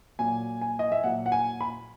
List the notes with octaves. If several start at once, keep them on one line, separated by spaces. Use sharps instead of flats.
A#2 F#3 G#5
G#5
D#5
E5
A#2 F#3 F#5
F#5
G#5
B5